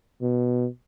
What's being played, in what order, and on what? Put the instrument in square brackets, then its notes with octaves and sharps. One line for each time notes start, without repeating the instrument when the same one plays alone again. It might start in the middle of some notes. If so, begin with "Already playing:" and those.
[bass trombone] B2